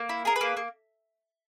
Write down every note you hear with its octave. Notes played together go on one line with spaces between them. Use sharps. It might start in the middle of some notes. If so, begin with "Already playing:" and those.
Already playing: A#3
E4
G#4 A#4
B4
A#3
A#3